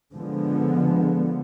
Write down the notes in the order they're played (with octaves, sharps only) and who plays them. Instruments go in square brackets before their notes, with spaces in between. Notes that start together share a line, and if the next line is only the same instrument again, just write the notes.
[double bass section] D3 F3 G#3 B3